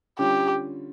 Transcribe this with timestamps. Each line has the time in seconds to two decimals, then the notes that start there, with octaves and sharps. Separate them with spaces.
0.19 D3 G3 C#4 F4 G4